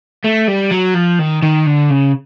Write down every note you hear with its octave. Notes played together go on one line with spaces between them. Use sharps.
A3
G3
F#3
F3
D#3
D#3
D3
C#3